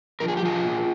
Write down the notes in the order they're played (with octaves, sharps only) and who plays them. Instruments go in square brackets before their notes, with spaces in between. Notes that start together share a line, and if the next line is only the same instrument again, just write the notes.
[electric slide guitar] F3 A#4
G#4
G4
F3 F4 G#4
A#2